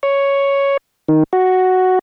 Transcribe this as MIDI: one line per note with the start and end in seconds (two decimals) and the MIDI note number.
0.03 0.77 73
1.08 1.23 51
1.33 1.99 66